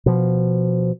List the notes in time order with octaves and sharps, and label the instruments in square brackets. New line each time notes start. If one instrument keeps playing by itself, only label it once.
[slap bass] B2 F3